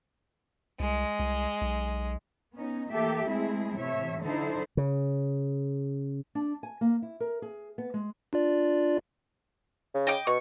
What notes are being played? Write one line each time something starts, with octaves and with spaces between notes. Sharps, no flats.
C2 G#3
C2
B1
B3 C#4 D#4
E3 A3 A#3 G4 A4 E5
G#3 A3 C4 E4 G#4
A2 C3 E3 C#5 E5
D3 F#3 D#4 E4 A4 C5
C#3
D4
G#5
A#3
E4
A#4
G#4
B3
G#3
D4 F4 D5
C#3
D#5 G5 D6
B2 C#6